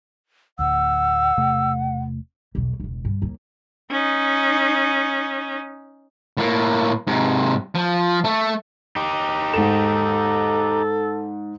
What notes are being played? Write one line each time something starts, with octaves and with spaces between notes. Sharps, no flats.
D1 G#1 D2 F#5 E6
E1 C3 A3
B1 E2
E1 C#2
G2
D#2
C#4 D#4
A2 A#3
G#2 C3
F3
A3
D#4 G4
G#2 A4 E7